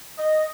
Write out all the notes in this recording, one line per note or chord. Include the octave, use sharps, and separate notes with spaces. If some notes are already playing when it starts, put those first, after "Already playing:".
D#5